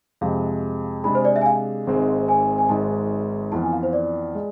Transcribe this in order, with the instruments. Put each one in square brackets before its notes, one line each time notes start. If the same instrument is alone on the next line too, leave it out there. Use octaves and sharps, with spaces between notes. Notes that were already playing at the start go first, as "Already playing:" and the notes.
[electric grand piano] F2 C3 G#3 [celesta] F5
[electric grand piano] C3 G#3 D4 G#4 [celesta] B5
[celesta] C5
D5
E5
G#5
F5
[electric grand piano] G#1 G#2 G#3 C4
[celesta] G#5
G#5
[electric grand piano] G#1 G#2 G#3 [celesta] A5
[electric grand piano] F2 E3 B3 F4 [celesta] A5
[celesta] G#5
F5
C5
D5
[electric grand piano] G#3